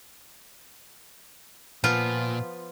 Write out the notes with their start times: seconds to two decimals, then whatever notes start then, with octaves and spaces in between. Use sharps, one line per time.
1.84 A#2 F3 B3 F4